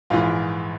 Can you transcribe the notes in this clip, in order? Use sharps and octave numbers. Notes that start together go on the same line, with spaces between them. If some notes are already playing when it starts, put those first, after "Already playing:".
A#1 G#2 E3 F4